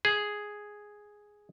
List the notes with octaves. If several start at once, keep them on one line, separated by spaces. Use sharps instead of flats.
G#4